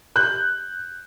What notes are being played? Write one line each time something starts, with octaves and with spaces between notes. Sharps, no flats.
F#6 G6